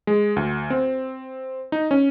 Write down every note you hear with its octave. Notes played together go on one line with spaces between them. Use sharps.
G#3
D2
C4
D#4
C#4